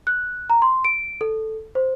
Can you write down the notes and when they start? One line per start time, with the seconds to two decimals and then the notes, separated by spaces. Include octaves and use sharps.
0.07 F#6
0.50 A#5
0.62 C6
0.85 D7
1.21 A4
1.75 C5